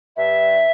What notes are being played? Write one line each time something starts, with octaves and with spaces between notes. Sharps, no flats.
G2 E5